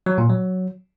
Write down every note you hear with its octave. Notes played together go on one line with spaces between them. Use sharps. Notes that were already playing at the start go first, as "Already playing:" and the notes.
F#3
A#2
F#3